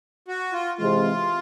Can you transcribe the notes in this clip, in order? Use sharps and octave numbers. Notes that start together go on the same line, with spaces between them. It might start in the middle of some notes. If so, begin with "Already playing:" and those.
F#4
F4
C3 E3 G#3 F4